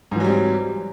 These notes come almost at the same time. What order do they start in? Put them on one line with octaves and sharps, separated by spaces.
G#2 E3 F#3 G3 C4